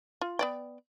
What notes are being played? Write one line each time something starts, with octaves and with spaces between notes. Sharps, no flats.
F4
B3 D5 G5